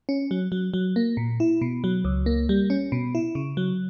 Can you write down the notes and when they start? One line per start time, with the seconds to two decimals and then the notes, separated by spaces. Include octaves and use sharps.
0.09 C#4
0.31 F#3
0.52 F#3
0.74 F#3
0.96 A#3
1.17 A#2
1.40 E4
1.62 B2
1.84 F#3
2.05 C#2
2.26 A#3
2.49 G3
2.70 C#4
2.92 B2
3.15 E4
3.35 C#3
3.57 F#3